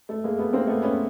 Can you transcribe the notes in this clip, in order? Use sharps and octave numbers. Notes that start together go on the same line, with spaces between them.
A3
G#3 A#3
A3 B3
A#3 C4
A3 B3
B3 C#4